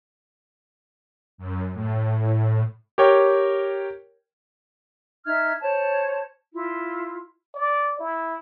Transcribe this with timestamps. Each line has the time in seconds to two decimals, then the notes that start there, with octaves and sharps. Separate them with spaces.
1.38 F#2
1.74 A2
2.16 A2
2.98 G4 A#4 C#5 G5
5.26 D#4 E5 F6 G#6
5.60 C5 C#5 A5
6.53 E4 F4
7.55 D5
8.00 E4